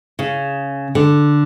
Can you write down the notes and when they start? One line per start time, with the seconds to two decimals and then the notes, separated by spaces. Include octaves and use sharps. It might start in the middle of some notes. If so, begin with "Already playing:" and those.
0.19 C#3
0.95 D3